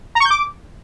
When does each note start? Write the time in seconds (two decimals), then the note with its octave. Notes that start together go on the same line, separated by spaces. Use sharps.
0.15 A#5
0.20 C#6
0.25 G6
0.30 D6